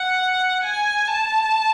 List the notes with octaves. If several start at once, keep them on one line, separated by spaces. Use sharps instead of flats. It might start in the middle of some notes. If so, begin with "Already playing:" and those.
Already playing: F#5
G#5
A5